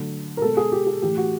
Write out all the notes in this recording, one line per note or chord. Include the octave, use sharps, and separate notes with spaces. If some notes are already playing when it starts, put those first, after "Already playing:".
Already playing: D3 F#3 A3
A#4
B2 G#3 A4
G#4
G4
G#4
A2 E3 A3 G4
F#4